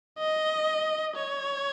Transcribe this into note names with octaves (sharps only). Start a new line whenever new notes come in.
D#5
C#5